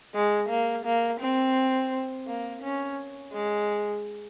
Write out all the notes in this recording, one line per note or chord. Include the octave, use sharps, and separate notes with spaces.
G#3
A#3
A#3
C4
A#3
C#4
G#3